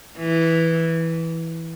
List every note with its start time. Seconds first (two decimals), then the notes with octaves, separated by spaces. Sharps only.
0.18 E3